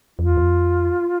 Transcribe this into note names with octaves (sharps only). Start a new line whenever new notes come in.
F2 F4
E2
F2